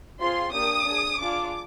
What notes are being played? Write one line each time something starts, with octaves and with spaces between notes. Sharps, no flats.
C4 F4 G#4 C6
A#3 D4 G4 D#6
D4 G#4
D4 F4 G#4 D6